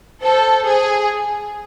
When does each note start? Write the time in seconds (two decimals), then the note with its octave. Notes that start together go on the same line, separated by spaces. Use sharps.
0.22 A4 C5
0.66 G#4